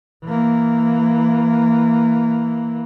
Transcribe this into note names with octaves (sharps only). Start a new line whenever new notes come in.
E3 A#3